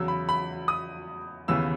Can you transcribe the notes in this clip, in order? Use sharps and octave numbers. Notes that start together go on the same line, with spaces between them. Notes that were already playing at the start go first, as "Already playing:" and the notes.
Already playing: E2 C#3 F#3 E6
B5
B5
D#6
D#2 C#3 E3 B3 E6